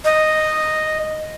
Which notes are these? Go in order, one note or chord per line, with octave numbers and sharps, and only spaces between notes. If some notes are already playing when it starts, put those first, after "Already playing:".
D#5